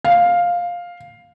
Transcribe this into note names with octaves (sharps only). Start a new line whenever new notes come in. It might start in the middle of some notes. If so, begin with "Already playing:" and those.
F5